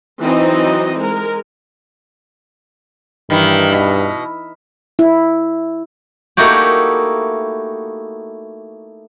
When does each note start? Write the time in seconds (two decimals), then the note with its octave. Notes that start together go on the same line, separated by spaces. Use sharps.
0.21 E3 F#3 C4 D#4 D#5
0.98 G#3 A#4
3.30 G2 D#3 E3
3.73 B2
4.99 E4
6.37 A3 A#3 D#4 E4 F#4 G4